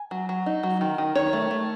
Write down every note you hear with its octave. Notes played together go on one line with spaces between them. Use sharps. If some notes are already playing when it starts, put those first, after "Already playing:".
Already playing: G#5
F#3
F#3
D#4
F#3
D#3
D#3
D#3 C#5
A3
A3